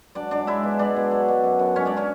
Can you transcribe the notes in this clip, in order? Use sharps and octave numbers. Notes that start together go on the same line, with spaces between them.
F#3 D4 D5
G#2 D4 D5
G#3 E4 E5
B2
G#3 D4 D5
B2
F#3
B2
F#2
F#2
G#2 C#4 C#5
D4 D5
C#4 C#5